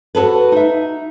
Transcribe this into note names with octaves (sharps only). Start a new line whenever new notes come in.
F#4 G#4 A4 B4
D#4 E5